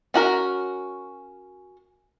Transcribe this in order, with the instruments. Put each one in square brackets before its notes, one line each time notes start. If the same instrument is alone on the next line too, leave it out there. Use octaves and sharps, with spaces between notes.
[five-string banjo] C#4 F#4 A#4